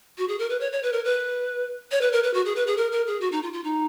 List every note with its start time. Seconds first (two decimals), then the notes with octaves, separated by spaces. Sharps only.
0.18 F#4
0.28 G#4
0.39 A#4
0.50 B4
0.60 C#5
0.72 C#5
0.83 B4
0.93 A#4
1.05 B4
1.91 C#5
2.01 B4
2.12 A#4
2.23 B4
2.34 F#4
2.45 G#4
2.56 B4
2.67 G#4
2.77 A#4
2.92 A#4
3.07 G#4
3.21 F#4
3.32 D#4
3.43 F4
3.53 F4
3.64 D#4